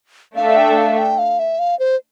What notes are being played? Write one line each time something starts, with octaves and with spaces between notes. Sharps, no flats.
A3 D4 A4 E5 F5
G5
F5
G5
F5
E5
F5
C5